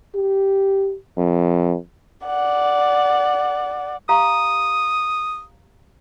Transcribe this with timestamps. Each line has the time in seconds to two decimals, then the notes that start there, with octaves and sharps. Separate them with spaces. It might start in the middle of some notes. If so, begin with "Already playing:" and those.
0.15 G4
1.18 F2
2.26 D5 F#5
4.09 G4 F5 A#5 D#6